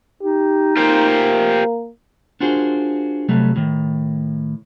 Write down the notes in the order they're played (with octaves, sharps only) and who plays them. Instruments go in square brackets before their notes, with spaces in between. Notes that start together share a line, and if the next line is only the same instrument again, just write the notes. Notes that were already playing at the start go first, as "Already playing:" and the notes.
[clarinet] D#4 [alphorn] G4
[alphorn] A#3 [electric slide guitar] F4 G4 C5
[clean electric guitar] D4 F4 F#4 G#4 A#4 C5
C3 F#3 G3 A3
A2 D#3